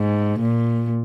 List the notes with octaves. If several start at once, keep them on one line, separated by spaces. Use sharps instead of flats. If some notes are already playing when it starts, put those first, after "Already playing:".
Already playing: G#2
A#2